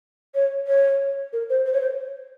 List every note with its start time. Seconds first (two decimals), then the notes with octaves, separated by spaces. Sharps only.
0.35 C#5
0.67 C#5
1.33 A#4
1.50 C5
1.66 C5
1.73 C#5
1.81 C5